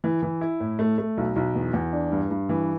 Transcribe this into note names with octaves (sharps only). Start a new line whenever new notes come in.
E3
E3
E4
A2
A3
A3
B1
B1
E2
E2
D4
G2
G2
E3